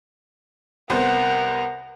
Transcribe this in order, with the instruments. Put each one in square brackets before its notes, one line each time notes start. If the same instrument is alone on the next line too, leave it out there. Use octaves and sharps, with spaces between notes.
[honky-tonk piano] C2 B3 C5 [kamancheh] A#4 F#5